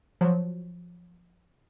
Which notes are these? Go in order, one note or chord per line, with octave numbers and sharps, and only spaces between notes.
F3 F#3